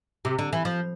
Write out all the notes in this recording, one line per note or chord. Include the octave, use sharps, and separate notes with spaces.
C3
D3
E3
F3